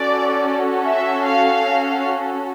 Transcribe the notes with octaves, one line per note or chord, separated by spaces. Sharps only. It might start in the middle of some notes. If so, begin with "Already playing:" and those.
Already playing: C#4 F#4 A4 D5
E5
F5